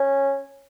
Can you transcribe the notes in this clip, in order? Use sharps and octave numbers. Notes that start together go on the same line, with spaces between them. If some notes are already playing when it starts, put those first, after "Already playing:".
Already playing: C#4